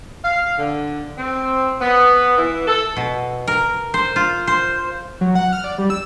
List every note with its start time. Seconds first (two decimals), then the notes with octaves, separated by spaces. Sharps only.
0.24 F5
0.59 D3
1.18 C4
1.81 B3
2.37 E3
2.68 A4
2.97 B2
3.47 A#4
3.94 C5
4.16 F4
4.47 C5
5.21 F#3
5.35 F#5
5.53 F6
5.64 D5
5.78 G3
5.90 E6